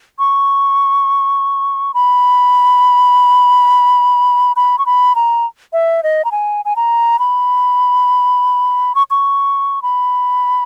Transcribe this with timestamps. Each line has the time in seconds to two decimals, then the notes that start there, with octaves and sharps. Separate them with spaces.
0.19 C#6
1.94 B5
4.56 B5
4.79 C#6
4.86 B5
5.15 A#5
5.73 E5
6.03 D#5
6.25 A#5
6.32 G#5
6.65 G#5
6.76 A#5
7.19 B5
8.95 C#6
9.11 C#6
9.82 B5